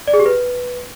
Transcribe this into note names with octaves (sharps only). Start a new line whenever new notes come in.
D5
G#4
G4
B4